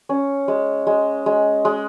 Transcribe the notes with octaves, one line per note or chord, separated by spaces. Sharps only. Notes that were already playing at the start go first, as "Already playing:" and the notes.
C#4
G#3
G#3
G#3
G#3